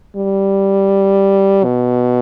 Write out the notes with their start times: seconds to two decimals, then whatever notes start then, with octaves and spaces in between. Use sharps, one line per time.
0.16 G3
1.64 B2